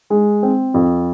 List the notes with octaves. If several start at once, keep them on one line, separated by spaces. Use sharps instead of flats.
G#3
C4
F2